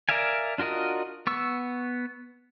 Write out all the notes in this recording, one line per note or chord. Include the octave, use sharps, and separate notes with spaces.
A#4 D5 E5 F5 G#5
D4 F4 F#4 A#4 D#5
B3 C#6 E6